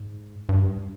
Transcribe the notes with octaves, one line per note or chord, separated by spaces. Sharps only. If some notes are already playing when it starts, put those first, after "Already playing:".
Already playing: G#2
G2